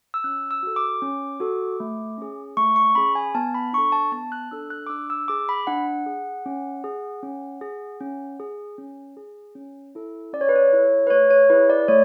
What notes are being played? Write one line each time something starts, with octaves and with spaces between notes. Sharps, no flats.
E6
C#4 F#6
E6
F#4 A4
D6
C#4
F#4 A4
A3
C#4 G#4
A3 C#6
C#6
C#4 G#4 B5
G#5
B3 A5
B5
D4 A4 C#6
A5
B3 A5
F#6
D4 A4 E6
F#6
D6
D4 E6
E6
G#4 D6
B5
D4 F#5
G#4
C#4
G#4
C#4
G#4
C#4
G#4
C#4
G#4
C#4
E4 A4
C#4 D5
C#5
B4
C#5
E4 A4
B4
A3 C#5
C#5
E4 G#4 B4
D5
A3 C#5